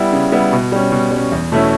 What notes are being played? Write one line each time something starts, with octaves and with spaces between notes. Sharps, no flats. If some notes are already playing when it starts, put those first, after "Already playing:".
Already playing: G3 B3 E4
C#3
G3 B3 E4
B2
G3 C#4
B2
G3
C#4
E2
B2 A3 C#4 E4